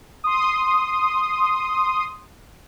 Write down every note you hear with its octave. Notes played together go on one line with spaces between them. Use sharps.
C6 D#6